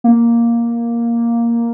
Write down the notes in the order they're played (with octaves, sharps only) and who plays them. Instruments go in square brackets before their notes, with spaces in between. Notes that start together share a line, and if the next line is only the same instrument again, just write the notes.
[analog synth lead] A#3